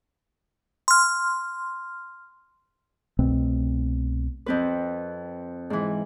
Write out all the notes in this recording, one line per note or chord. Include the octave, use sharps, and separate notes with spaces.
C6 F6
C2 B2 A3 C4
F2 C4 B4
G#2 E3